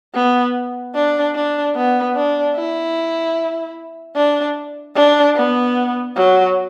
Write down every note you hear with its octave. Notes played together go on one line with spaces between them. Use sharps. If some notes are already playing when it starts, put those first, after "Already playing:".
B3
D4
D4
B3
D4
E4
D4
D4
B3
F#3